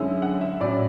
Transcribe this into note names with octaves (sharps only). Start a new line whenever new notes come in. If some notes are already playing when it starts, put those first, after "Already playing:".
Already playing: F#2 D3 G#3 C#4 E4
F#5
E5
A2 F#3 C#4 D5